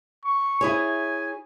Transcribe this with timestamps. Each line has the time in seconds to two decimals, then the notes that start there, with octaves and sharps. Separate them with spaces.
0.24 C#6
0.61 E4 G#4 C#5 G#5